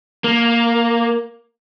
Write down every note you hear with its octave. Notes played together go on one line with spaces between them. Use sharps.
A#3